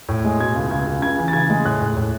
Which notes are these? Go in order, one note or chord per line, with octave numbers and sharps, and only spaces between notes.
A2
G#3
B2 G#6
C#2
C#2 G#6
C#2
C#3 G#6
E3
A6
C#3 G#6
G#3
A2 F#6
A2
A2